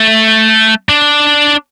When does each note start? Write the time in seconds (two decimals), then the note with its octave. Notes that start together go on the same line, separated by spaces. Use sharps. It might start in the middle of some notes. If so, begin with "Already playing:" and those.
Already playing: A3
0.89 D4